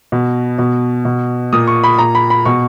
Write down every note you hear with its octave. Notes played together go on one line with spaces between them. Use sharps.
B2
B2
B2
A#2 D#6
C#6
B5
A#2 A#5
B5
B5
B2 C#6